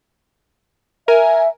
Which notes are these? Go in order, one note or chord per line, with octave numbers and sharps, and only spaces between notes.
A#4 E5 G#5